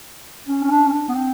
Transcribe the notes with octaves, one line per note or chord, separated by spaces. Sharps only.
C#4
C#4
D4
C#4
D4
B3
C4